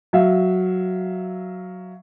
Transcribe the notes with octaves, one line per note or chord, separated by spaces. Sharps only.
F#3 E5 F5